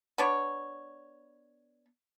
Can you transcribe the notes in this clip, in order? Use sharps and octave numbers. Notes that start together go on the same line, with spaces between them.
B3 D4 C#5